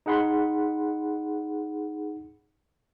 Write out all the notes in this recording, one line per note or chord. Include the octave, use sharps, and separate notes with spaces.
D#4 G#4 F#5 B5 C6